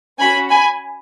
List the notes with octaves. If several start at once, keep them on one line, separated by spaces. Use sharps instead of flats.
C#4 F#4 G#5 B5
G#5 B5